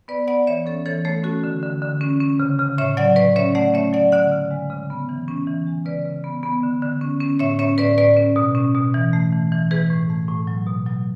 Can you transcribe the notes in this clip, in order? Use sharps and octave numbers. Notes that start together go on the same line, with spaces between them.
B3 B4 D5
B3 D5 F#5
E3 C#5 E5
C#4 A4 C#5
E3 A4 C#5
A3 A4 C#5
C#4 F#4 A4
D3
D3
D3
C#4
C#4
C#3
C#3
A2 C#5 E5
F#3 D5 F#5
A2 B4 D5
C#4 C#5 E5
A3 D5 F#5
C#4 C#5 E5
F#3 D5 F#5
D3 D5 F#5
C#3
G#3
C#3
B3
E3
C#4
E3
G#3
C#3 B4 D5
C#3
B3
B3
D3
D3
C#4
C#4
A2 C#5 E5
C#4 C#5 E5
A2 B4 D5
A2 B4 D5
C#4
B2
C#4
B2
E3
A3
E3
E3
E3 G#4 B4
A2
A3
A2
F#3
B2
F#3